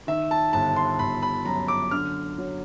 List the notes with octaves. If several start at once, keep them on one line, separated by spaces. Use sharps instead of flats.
D#3 E5
A5
G1 A5
C6
G1 B5
B5
F#2 A#5
D6
D3 F6
F#3